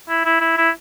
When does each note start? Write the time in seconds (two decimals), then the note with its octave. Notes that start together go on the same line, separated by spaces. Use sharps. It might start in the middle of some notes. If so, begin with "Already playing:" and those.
0.09 E4
0.25 E4
0.41 E4
0.58 E4